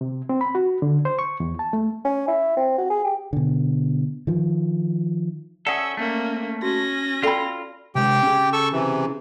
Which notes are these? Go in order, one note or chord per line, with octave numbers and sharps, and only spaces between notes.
C3
C4
B5
F#4
D3
C5
C#6
E2
A5
A3
C#4
E4
C4
F#4
G#4
G4
B2 D3
D#3 F3
C#4 A4 D5 E5 F#5 D#6
A3 A#3 C#4
C#4 F#4 A#6
F4 A4 D5 G5 B5
C3 G#3 G4 G5
C#4 G#4
A4 C#6 E6
C3 E3